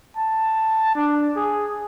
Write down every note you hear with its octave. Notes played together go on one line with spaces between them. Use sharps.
A5
D4
G#4